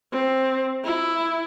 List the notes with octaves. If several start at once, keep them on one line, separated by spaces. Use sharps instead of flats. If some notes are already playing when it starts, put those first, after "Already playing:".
C4
E4